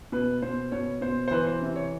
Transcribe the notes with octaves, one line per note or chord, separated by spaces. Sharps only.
B2 B4
B2 C5
B2 C#5
B2 C5
C5
E3 B4
C5
C3
C#5